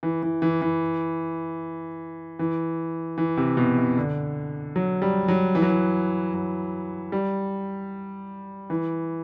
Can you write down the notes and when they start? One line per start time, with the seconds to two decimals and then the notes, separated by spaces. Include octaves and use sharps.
0.03 E3
0.23 E3
0.42 E3
0.62 E3
2.39 E3
3.18 E3
3.37 C3
3.57 B2
3.78 C3
3.97 D3
4.76 F#3
5.02 G3
5.28 F#3
5.55 E3
5.62 F#3
5.70 E3
6.34 F#3
7.12 G3
8.70 E3